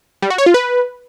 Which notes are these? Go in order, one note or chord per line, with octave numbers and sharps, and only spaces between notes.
G3
F#4
C#5
F4
B4